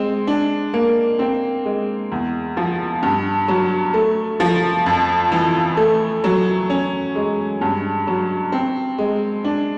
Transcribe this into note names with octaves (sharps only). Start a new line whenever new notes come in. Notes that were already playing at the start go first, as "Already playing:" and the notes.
Already playing: G#3 C4
D4
A#3
C4
G#3
E2
F3
G2
F#3
A3
F3
F2
E3
A3
F#3
C#4
G#3
G2
F#3
C4
G#3
D4